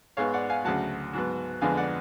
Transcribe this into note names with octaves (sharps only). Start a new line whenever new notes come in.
G#2 G#3 B3 C#5 F5
D5 F#5
F5 G#5
D2 C#3 F#3 F#5 A5
G#2 F#3 B3
F2 D3 G#3 B3 F5 G#5
D5 F#5